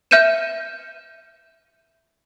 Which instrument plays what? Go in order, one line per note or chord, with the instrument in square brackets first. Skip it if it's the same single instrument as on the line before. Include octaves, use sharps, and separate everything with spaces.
[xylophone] E5 F6 G6 C#7 D#7 E7